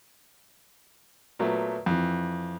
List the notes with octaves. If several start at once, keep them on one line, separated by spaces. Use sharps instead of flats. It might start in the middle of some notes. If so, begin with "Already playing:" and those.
A#2 F#3 A3 B3
F2 E3